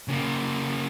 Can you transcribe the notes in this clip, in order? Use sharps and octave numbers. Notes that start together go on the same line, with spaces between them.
C#3 A#3